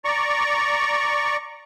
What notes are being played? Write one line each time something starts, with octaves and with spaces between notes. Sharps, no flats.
D5 A#5 C#6